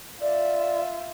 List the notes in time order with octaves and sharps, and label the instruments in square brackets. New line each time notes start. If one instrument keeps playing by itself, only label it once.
[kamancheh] F4 E5 [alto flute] D5